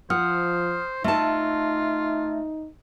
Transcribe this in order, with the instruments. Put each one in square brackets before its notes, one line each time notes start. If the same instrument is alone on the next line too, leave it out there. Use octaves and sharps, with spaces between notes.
[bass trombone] F3 [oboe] C5 [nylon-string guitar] F#5 [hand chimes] D#6 F6
[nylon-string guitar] A3 A5 [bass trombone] D#4 [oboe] F4 [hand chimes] E5